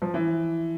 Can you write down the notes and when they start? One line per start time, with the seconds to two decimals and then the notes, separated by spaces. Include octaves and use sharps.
0.02 F3
0.14 E3